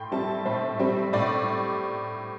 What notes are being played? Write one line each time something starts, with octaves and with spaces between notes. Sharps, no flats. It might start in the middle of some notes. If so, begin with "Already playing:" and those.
Already playing: A2 G5 C6
G3 C4 E5 A5
A2 C5 E5
G3 C4
A2 D5